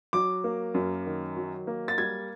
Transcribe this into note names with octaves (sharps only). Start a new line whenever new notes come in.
F#3 D6
A#3
F#2
D#3
F#3
A#3
A6
G3 G#6